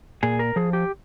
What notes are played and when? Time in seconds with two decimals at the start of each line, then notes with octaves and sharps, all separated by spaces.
0.23 A#2 G#4
0.39 A#4
0.56 F3 G#4
0.73 G4